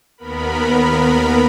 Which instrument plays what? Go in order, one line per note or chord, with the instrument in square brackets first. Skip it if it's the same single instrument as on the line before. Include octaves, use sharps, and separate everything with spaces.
[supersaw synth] D#2 B3 A#4 B5